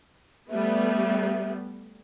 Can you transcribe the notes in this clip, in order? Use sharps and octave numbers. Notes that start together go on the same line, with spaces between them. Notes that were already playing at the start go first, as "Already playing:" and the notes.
G3 A3 B3 E5